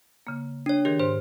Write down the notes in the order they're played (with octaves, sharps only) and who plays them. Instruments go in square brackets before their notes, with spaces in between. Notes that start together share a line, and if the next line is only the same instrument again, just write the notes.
[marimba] C#3 A#3
[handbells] D4 C#5
[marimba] D#3 G#4 A#4 [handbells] G4
[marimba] G#2 [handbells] C5